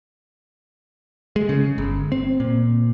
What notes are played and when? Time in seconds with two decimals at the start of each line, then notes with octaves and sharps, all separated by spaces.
1.36 G#3
1.49 C#3
1.78 G1
2.12 C4
2.40 A#2